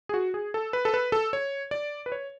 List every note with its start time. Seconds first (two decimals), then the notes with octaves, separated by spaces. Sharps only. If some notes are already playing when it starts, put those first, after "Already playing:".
0.09 G#4
0.14 F#4
0.34 G#4
0.54 A4
0.73 B4
0.85 A4
0.94 B4
1.12 A4
1.33 C#5
1.71 D5
2.06 B4
2.12 C#5